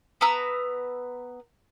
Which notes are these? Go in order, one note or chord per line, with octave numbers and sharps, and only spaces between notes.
B3 B4 A#5 E6